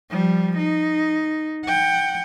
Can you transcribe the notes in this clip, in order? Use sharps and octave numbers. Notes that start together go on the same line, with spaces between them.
F3 G3
D#4
F#5 G5